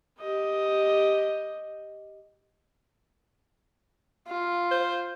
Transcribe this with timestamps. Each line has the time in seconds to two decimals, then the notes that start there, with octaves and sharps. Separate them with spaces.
0.20 G4 D#5
4.28 F4
4.71 C5